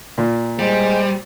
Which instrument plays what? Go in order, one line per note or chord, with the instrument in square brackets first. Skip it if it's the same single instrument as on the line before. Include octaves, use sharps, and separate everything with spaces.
[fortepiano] A#2
[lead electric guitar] G3 [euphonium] G#3 [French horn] C5